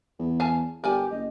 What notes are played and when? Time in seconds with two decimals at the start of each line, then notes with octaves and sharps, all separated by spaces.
0.19 E2
0.40 F5 G#5 A5
0.84 G1 G4 A#4 D5 G#5
1.11 F#1 D#5